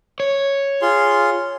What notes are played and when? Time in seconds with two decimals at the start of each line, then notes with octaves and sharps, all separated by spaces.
0.20 C#5
0.82 F4 G#4 C6